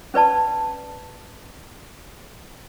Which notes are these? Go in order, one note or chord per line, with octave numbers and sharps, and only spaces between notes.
C#4 B4 D5 A5